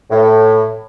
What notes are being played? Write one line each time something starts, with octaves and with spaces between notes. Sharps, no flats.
A2